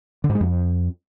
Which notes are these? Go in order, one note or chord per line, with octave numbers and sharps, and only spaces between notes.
D3
G#2
G#3
F2